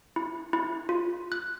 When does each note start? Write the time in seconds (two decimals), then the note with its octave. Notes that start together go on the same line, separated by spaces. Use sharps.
0.16 E4
0.53 E4
0.89 F4
1.32 F#6